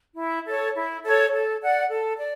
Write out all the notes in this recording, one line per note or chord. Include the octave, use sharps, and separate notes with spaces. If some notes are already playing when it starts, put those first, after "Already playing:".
E4
A4 C#5
E4
A4 C#5
A4
D5 F#5
A4
D5